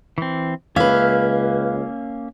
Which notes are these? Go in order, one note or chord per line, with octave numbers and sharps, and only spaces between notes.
E3 C4
C#2 A#3 C#4 B4 E5 F5